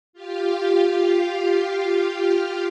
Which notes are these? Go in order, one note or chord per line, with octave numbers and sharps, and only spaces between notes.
F4 G4 F5